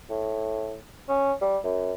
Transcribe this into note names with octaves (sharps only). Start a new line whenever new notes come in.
A2
C#4
G3
F#2